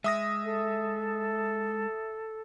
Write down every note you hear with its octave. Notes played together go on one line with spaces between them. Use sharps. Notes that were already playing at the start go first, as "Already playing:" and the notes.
G#3 E5 D#6 A#6
A4